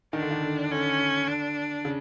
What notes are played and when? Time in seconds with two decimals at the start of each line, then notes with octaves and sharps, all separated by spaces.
0.13 D#3 D4
0.22 D3
0.31 D#3
0.42 D3
0.71 D3 C#4
1.28 D4
1.85 C#3